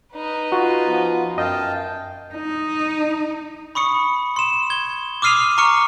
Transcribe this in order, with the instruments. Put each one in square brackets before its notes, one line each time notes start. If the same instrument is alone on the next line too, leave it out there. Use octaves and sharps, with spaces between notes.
[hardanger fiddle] D#4 B4
[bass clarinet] F4 [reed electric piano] F#4
[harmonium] F3 B3
[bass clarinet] F#2 [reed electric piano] D#5 [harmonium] F5 G5 A5
[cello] D#4
[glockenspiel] B5 C#6 D#6 C#7
C6 E7
G#6 G7
D6 D#6 F6 C7 D#7 F7
A#5 C#6 D6 F6 C#7